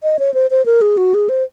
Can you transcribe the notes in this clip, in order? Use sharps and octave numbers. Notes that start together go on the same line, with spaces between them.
D#5
C#5
C5
C5
A#4
G#4
F#4
G#4
C5